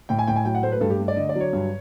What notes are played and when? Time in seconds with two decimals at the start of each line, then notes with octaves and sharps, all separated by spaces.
0.09 A2 G5
0.19 G#5
0.28 A2 G5
0.36 G#5
0.45 F#3 G5
0.55 F#5
0.63 A3 C5
0.72 B4
0.81 G2 A4
0.90 G4
1.00 A3
1.08 D5
1.16 D3 D#5
1.29 D5
1.36 F#3 C#5
1.53 G2